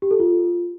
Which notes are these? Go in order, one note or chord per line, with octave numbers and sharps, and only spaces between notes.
G4
A4
F4